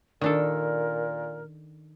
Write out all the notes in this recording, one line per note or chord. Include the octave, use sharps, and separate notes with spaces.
A#2 D#3 D4 A4 A#4